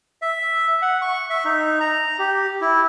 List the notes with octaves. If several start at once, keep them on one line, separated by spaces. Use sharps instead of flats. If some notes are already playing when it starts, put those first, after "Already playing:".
E5
F#5
C#6
E5
D#4
A#5
G4
E4